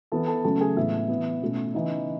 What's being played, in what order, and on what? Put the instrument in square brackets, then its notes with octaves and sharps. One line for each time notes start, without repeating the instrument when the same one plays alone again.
[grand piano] E3 B3 A4 A5
A4 A5
C#3 F#3 A3 C#4 A4 A5
G#4 G#5
A2 E3 G#3 B3 E4 E5
E3 B3
B2 A3 C#4
C#3 E3 B3 D#4 D#5